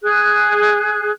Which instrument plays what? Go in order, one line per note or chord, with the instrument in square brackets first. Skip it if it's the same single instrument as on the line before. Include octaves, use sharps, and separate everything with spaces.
[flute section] G#4 F#6